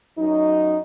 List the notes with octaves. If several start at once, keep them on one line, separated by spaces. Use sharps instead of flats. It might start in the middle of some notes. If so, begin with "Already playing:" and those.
F#2 F#3 D#4